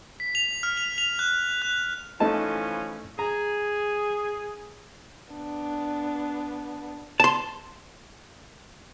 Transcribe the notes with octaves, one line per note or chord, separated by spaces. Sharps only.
B6
F7
F6
F7
F7
F#6
F#6
E3 F3 A3 C#4 D#4 A5
G#4 A#5
B3 D4
A5 C6